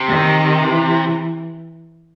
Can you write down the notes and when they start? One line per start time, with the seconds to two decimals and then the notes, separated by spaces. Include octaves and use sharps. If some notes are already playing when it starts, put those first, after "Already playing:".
Already playing: C3
0.08 D#3
0.63 E3